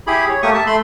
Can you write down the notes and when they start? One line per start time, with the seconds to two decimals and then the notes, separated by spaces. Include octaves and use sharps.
0.07 E4 G4 G#4 B5
0.29 C#5
0.43 A3 A#3 G4 C#6 D#6
0.54 E5 A5
0.67 A3 B5 C6